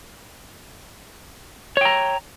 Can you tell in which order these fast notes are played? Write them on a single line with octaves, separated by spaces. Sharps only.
C#5 G5 A#5